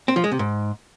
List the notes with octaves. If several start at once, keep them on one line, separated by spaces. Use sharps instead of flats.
C4
F3
G#3
C3
G#2